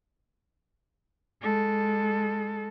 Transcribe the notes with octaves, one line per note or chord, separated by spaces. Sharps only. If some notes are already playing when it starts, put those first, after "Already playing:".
G#3 A4